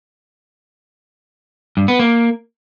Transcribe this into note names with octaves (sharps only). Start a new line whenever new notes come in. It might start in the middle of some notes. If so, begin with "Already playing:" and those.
G2
B3
A#3